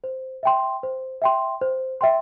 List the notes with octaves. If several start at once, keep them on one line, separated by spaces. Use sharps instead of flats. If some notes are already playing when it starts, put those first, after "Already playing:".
C5
E5 G5 C6
C5
E5 G5 C6
C5
E5 G5 C6